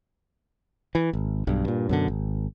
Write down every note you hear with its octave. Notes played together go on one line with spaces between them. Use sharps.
E3
G#1
B1 G2
G2 A#2
F#2 B2 D3
G#1